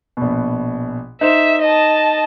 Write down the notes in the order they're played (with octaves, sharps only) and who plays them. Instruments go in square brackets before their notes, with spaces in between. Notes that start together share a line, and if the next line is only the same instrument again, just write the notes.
[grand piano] A#1 B2
[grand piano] D#4 C5 E7 [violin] E5
[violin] D#5 A5